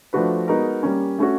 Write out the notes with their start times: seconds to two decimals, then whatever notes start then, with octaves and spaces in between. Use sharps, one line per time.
0.13 F3 A3 D4 F#4 B4
0.48 G#3 B3 D#4 F#4 A#4
0.83 G3 A#3 C#4
1.19 A3 C#4 F#4